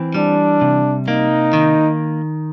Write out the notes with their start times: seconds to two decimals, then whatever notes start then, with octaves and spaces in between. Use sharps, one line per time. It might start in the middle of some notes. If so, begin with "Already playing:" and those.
Already playing: E3 C4
0.14 G3 D4
0.61 C3
1.08 A#3 D#4
1.53 D#3